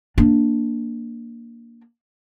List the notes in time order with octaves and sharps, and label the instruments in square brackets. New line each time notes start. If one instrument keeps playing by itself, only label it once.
[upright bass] A#3 D4